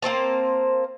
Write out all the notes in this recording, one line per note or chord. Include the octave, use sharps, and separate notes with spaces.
A#3 C4 C5 A5